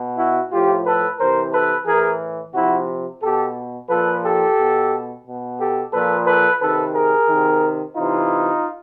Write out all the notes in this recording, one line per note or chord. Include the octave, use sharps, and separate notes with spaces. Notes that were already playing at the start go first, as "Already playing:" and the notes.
Already playing: B2
E4 F#4
A2 F3 F4 G4
A4 B4
C3 E3 A#4 C5
A4 B4
A2 E3 G#4 A#4
C3 F3 E4 F#4
B2 G4 A4
A#2 F3 A4 B4
G4 A4
B2
B2
G4 A4
A#2 F3 A4 B4
A4 B4
C3 D#3 A4 B4
G#4 A#4
C3 D#3
C3 E3 D#4 F4